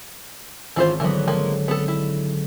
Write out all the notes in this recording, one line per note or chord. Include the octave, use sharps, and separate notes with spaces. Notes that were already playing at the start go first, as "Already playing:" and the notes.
G#1 E3 C4 C#4 F4 C5
D3 E3 F#3 B3
F3 G#3 A#3
B3 A4
E4